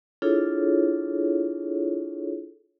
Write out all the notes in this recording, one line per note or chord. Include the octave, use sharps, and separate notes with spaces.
D4 E4 F4 G#4 A4 C#5